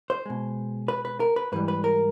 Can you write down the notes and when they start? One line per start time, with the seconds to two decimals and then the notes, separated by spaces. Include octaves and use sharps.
0.10 C5
0.26 B2 G#3
0.88 B4
1.05 B4
1.20 A#4
1.36 B4
1.52 G#2 E3 G3 B4
1.68 B4
1.84 A#4